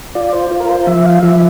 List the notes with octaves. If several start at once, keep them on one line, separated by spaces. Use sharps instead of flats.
F4 D5
C5
F4
A#4
C5
F3 E5
F5
F3 E5